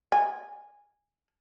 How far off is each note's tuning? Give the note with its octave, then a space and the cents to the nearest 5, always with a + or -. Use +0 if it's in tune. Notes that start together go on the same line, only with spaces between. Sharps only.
G#5 -10